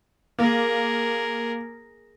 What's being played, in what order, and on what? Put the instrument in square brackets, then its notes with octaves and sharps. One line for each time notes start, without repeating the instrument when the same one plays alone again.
[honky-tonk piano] A#3 [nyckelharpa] G#4 A#4